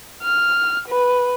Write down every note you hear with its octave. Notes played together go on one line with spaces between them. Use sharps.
F6
B4